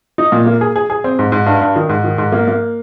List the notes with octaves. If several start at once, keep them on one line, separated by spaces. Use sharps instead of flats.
D#4
A#2
A#3
G#4
G#4
G#4
C4
G#2
G#2
G2
G2
D#3
G#2
D#3
G#2
A#3
A#3